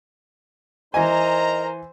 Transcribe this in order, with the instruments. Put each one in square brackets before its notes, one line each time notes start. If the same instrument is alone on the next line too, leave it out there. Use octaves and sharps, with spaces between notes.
[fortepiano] E3 G#5 [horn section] D#4 A#4 A#5 [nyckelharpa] C5 [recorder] D#5